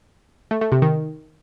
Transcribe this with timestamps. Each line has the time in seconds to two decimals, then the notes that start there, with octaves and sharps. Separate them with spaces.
0.51 A3
0.61 A3
0.72 C3
0.82 D#3